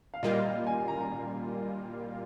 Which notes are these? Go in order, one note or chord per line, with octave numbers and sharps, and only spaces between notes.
F5
A#2 G3 A#3 F4 D#5
F5
G#5
A#5
A#5